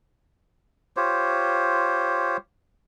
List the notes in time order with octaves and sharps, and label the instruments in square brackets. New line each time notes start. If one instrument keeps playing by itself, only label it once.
[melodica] F4 G4 C5 C#5